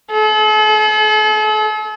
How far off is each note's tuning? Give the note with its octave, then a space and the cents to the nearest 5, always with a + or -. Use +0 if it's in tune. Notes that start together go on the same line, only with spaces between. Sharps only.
A4 -45